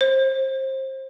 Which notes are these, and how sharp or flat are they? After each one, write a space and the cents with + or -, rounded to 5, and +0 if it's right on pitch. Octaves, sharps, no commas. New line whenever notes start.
C5 +25